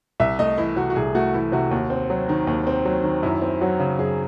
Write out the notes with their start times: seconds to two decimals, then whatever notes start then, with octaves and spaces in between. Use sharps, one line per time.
0.20 C2 E5
0.39 A3 D#5
0.58 E3 E4
0.76 C3 F#4
0.90 F#4
0.96 C2 G#4
1.15 A3 F#4
1.34 E3 E4
1.52 C3 F#4
1.71 D#2
1.90 C4
2.10 F#3
2.29 D#3
2.47 D#2
2.67 C4
2.85 F#3
3.04 D#3
3.23 F#2 E4
3.42 C4
3.61 F#3 F#4
3.79 C#3
3.99 F#2 G#4